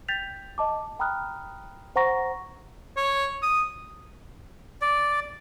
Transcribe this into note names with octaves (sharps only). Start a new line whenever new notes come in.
G5 G6 A6 B6 F7
D#5 A5 D6
G5 A#5 B5 D#6 F6 F#6
C5 F#5 A#5 C#6 A#6
C#5
D#6
D5